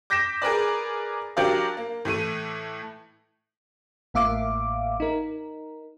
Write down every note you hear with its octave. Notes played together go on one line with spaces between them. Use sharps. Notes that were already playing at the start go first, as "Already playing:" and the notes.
D6 G6 A#6 B6 D7 E7
G#4 A#4 B4 D5
F#3 D4 G4 A#4 D5 F5
A#3
A2 E3 A3 D#7
A1 A2 A#3 E5 F5 D6
D#4 A#4